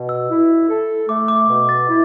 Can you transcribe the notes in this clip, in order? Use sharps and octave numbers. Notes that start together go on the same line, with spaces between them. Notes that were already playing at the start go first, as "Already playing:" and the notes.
Already playing: B2
E6
E4
A4
A3 D6
D6
B2
A6
E4